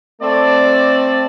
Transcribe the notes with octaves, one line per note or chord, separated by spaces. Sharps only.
A3 C4 D5